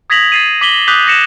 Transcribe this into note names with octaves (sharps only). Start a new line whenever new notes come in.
D#6 G#6 A#6 B6 F7 F#7
A6 C7 D#7
D6 B6 F#7 G7
D6 D#6 F#6 G6 B6 F7
D6 A#6 C#7 E7